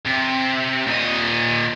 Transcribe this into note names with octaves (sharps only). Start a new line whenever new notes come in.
C3
A#2 D#5